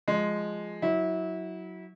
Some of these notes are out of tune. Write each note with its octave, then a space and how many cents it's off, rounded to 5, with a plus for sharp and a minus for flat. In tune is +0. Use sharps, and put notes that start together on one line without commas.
F3 +0 G#3 +0
F#3 +0 E4 -25